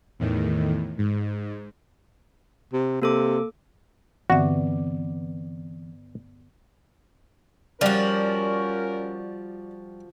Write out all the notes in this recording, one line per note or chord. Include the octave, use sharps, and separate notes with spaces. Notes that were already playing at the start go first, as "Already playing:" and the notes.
E2 A2 D#3
G#2
C3
C3 A#3 A4 D6
G2 D3 E3 B3 C4 F#4 D5 E5
F3 G3 C#4 F#4 A#4 D5